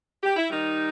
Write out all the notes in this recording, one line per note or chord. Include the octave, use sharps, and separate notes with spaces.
G4
E4
D#3 G3 D#4